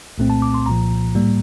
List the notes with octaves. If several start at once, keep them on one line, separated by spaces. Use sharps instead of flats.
C2 A#2 A3 C4
A5
D6
C6
C2 A#2 F3 A#5
A2 G3 A#3